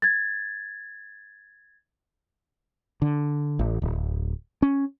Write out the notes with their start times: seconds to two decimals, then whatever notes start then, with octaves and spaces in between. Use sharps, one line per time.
0.02 G#6 A6
3.02 D3
3.59 A1
3.82 D1
4.62 C#4